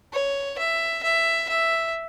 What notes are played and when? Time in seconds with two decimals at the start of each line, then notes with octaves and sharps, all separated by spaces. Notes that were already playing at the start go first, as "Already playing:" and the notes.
0.13 C#5
0.58 E5
1.03 E5
1.49 E5